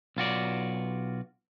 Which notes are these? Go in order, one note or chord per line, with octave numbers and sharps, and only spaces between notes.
B1 F4 F#4 D5